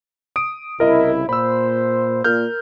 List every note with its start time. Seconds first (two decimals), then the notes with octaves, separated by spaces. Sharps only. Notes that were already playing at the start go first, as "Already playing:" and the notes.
0.36 D#6 D7
0.80 C2 C#3 E4 A#4 D#5
1.29 A#2 C5 B5 E6
2.24 A#2 A#4 F6 G6